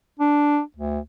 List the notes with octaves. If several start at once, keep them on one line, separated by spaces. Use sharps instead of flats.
D4
D2